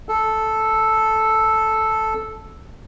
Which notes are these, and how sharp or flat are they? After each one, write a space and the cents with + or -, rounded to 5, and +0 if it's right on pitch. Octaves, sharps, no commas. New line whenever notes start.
A4 -5